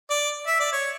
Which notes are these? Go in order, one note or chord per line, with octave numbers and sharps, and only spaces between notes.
D5
E5
D5
C#5